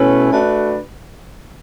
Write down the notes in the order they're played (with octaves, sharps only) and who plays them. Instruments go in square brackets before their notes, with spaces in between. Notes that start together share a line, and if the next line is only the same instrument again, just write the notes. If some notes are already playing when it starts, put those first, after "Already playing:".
Already playing: [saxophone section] B2 A3 E4 B4 [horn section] C#4
[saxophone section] A3 D4 F#4 B4